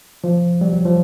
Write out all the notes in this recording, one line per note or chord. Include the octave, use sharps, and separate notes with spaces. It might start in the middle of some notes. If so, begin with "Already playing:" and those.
F3
G3
F#3
F3